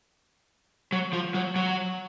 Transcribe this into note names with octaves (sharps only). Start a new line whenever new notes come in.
F#3
F3
F#3
F#3